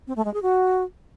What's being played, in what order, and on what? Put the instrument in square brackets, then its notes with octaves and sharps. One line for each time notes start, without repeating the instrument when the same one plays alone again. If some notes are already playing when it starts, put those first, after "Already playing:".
[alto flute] C4
A3
G#3
G#4
F#4